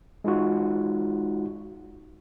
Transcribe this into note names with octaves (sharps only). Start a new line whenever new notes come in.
G#3 D#4 F4 F#4